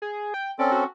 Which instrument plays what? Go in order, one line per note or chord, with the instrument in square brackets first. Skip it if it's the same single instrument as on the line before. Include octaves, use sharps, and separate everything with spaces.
[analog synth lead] G#4
G5
[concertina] C4 C#4 A4 [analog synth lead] D5
[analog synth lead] F#4